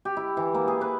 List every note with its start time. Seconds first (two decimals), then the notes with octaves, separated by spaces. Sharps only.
0.05 G4
0.17 E4
0.37 E3
0.54 A#3
0.68 G#4
0.81 B4